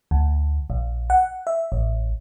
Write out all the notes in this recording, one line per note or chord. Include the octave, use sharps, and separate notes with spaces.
D2
A#1
F#5
E5
A1